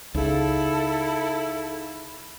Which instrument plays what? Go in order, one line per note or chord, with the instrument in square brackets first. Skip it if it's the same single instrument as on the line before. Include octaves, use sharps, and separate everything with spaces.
[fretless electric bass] C#2 [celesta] D#4 G#4 F5 [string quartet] E4 [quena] A4